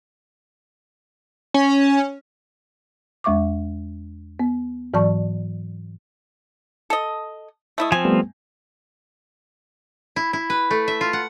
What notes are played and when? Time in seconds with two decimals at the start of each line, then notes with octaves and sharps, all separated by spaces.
1.54 C#4
3.24 E2 G#3 E5 C#6 D6
4.40 B3
4.94 G#2 E3 F#3 D5 A5 C#6
6.90 A4 D#5
7.78 A3 E4 D#5
7.92 F3 C4 G#5
8.05 G3 A3 B3
10.16 E4
10.33 E4
10.50 B4
10.71 A3
10.88 E5
11.01 F4
11.13 F#5